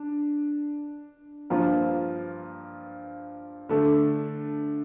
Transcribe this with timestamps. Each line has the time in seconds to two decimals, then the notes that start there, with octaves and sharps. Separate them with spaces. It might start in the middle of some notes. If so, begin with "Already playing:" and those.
Already playing: D4
1.50 G2 F3 A#3 F4
3.69 D3 A3 D4 A4